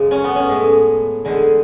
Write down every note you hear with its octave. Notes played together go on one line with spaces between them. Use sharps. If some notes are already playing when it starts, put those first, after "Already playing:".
Already playing: F#2 C#3 G#3
C#4
B3
C#4
A2 G#3
E2 D3 G#3